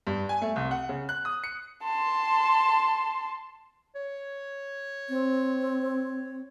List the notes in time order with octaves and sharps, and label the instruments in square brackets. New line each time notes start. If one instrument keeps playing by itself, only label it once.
[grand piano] G2
G#5
A3
C2
F#5
C#3
F#6
D#6
C#7
[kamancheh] A5 C6
[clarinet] C#5
[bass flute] C4